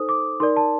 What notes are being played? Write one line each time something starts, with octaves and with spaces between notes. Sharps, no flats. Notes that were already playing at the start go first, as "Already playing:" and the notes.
Already playing: D#4 A4 C5 D#6
D6
D#4 A#4 D5 C6
A5